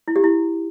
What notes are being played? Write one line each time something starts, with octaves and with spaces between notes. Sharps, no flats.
E4
G4
E4